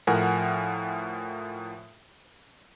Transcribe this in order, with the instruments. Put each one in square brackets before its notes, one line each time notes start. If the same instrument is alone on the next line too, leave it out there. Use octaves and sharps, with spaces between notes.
[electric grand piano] A2 F3 A#4 F#5 G#5